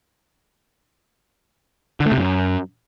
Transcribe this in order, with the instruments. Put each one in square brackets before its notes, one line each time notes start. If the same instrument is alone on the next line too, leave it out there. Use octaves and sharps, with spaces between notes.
[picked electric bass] D3
A3
C3
F#2